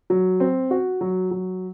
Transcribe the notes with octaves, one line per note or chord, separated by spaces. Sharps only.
F#3
C4
F#4
F#3
F#3